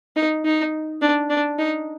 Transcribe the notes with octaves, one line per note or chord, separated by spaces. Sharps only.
D#4
D#4
D4
D4
D#4